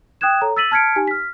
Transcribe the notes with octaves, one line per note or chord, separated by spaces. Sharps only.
G5 D#6 F#6 G#6 E7
A4 C#5 A#5
E6 A6 B6 D#7 F#7
A5 F6 G#6 B6 C#7 D7
D#4 G4 G#5
F6 B6